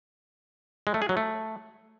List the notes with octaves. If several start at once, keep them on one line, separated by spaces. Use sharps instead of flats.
G#3
A3
G#4
F#3
A3